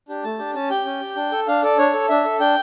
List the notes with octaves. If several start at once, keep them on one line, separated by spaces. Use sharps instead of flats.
D4 G4
A3 A5
D4 G4
C#4 A5
G4 G5
C#4
G4
D4
A4
D4 F5
A4 D5
D4 C#5
A4
D4 E5
A4
D4 G5